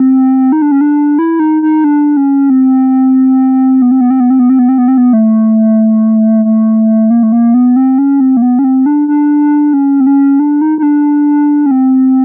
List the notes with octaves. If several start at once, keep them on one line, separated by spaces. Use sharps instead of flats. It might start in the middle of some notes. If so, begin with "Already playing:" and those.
Already playing: C4
D#4
D4
C#4
D4
E4
D#4
D#4
D4
C#4
C4
B3
C4
B3
C4
B3
C4
B3
C4
B3
C4
B3
C4
B3
A3
A3
A#3
A3
A#3
B3
C4
C#4
C4
A#3
B3
C#4
C4
D4
D4
C#4
C4
C#4
D4
D#4
D#4
D4
C#4
C4